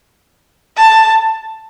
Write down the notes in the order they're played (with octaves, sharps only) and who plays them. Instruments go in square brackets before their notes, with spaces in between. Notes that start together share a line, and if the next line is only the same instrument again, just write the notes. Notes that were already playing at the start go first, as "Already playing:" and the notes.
[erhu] A5